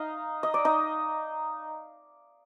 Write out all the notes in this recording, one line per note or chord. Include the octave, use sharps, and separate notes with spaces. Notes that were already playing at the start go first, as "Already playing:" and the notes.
Already playing: D#4 D#5 F5
D#5
D5
D#4 D#5